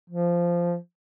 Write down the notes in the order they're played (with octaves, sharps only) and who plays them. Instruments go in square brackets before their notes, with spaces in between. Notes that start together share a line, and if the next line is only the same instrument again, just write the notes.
[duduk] F3